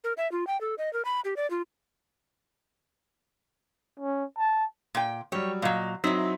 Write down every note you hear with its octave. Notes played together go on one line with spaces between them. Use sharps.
A#4
E5
F4
G5
A4
D#5
A#4
B5
G4
D5
F4
C#4
A5
A#2 G5
F#3 G3 G4 C#5
A#2 F#3 D#5 F5
F#3 C4 D#4 E4 B6